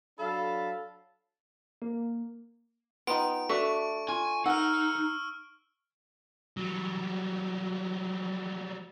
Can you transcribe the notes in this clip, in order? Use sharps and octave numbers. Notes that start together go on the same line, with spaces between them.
F#3 D4 A4 F5 A5 B5
A#3
B3 D#4 F4 G5 D7
A3 D4 F#4 E5 C#6
F4 G#5
D#4 F#5 E6 F6
F#3 G3